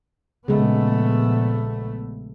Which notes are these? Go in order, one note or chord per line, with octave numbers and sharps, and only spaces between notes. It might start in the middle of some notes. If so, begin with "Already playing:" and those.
A#1 C#3 G#3 A3 B3